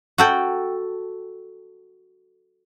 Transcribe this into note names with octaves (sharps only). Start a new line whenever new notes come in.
F#4 A4 G5